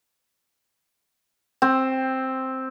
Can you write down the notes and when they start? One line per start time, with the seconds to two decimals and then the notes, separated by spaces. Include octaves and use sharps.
1.62 C4